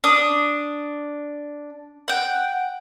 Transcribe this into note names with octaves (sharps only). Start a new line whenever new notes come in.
D4 D#6
F#5 G5